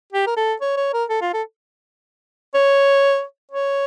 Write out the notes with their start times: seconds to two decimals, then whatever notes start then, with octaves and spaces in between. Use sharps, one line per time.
0.13 G4
0.27 A#4
0.37 A4
0.61 C#5
0.77 C#5
0.93 A#4
1.09 A4
1.21 F4
1.34 A4
2.54 C#5
3.51 C#5